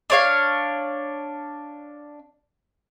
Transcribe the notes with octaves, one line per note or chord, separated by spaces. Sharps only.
D4 C#5 F5